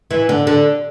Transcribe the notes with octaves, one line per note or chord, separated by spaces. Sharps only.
E3
D3
D3